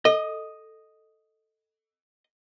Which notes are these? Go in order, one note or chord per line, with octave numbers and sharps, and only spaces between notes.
A4 D#5